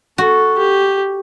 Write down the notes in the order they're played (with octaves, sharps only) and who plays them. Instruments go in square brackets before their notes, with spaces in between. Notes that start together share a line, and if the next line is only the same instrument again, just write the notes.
[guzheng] F#4 [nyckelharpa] A4
[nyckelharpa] G4